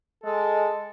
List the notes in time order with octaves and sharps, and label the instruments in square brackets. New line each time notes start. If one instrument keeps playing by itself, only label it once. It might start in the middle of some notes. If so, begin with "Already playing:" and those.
[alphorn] G#3 [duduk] A4